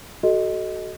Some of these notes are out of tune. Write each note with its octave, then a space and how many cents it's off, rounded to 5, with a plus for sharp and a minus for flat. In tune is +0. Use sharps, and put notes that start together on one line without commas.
F#4 +25 A4 -15 D#5 +0